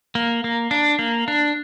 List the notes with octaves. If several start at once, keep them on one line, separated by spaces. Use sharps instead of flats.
A#3
A#3
D4
A#3
D4